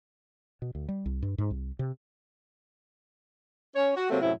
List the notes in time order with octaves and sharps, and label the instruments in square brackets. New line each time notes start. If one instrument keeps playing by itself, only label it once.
[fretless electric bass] B2
D2
G3
C2
G2
G#2
C2
C3
[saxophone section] C#4 C#5
F#4
C3 F#3 A3 A#3 C4
F#2 A2 C3 E4